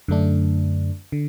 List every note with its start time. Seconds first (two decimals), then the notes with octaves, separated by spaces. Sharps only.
0.08 F#2 D3 A3 D4
1.12 D3